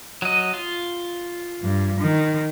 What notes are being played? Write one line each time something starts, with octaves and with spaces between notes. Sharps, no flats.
F#3 D#5
F4
G2
D#3